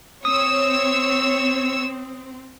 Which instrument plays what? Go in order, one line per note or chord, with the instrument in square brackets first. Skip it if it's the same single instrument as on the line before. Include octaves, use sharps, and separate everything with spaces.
[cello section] C4 [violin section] C#5 E6 [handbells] D#6